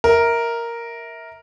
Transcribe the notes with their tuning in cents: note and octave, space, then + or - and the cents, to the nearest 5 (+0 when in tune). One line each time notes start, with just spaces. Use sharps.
A#4 +0 E5 -25